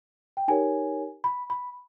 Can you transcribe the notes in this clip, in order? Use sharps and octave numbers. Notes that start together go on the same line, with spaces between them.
G5
D#4 G4 A#4 C#5 G#5
B5
B5